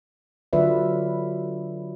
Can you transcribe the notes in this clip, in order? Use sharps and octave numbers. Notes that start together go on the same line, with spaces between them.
D3 F#3 F4 B4 D5 E5